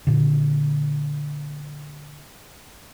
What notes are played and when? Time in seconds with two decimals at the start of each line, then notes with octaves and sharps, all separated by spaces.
0.07 A#2 D3